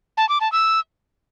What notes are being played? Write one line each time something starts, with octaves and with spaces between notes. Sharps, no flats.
A5
D6
A5
E6